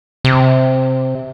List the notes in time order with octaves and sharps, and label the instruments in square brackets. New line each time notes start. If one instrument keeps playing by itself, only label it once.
[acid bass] C3